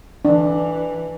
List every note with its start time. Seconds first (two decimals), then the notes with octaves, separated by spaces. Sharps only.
0.25 E3 D4